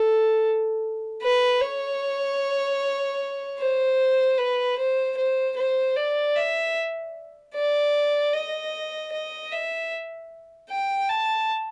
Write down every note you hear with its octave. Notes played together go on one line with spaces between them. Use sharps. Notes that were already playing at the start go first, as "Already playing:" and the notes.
Already playing: A4
B4
C#5
C5
B4
C5
C5
C5
D5
E5
D5
D#5
D#5
E5
G5
A5